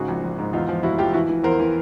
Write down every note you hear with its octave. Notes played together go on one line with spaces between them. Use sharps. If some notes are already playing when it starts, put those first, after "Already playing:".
Already playing: G#2 C#3 F#4 G#4
A#1
A#1
G#2
E2 D#4 F4
F3
F1 E4 F#4
F3 F4 G4
E3 E4 F#4
E3
E2 A#4 C5
E3